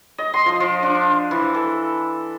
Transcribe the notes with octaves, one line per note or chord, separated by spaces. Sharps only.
D#5
C6
F3
F3
D4
E3
A4